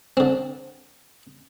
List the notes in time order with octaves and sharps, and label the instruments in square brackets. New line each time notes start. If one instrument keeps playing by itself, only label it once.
[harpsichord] D3 C4